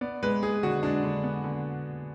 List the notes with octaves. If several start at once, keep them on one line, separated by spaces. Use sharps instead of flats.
B3 D5
G#3 B4
G#3 G#4
D3 F#4
G#3 D4
D3
B3
D3